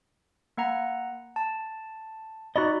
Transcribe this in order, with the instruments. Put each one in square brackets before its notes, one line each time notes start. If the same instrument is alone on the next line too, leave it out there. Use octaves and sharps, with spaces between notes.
[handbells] A#3 F#5 A#5
A5
[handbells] D#4 B5 [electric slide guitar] F#4 D5 D#5